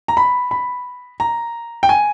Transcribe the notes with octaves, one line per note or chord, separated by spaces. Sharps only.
A#5
B5
B5
A#5
G5
G#5